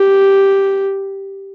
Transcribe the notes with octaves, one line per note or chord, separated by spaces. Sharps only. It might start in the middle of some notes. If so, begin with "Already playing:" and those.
Already playing: G4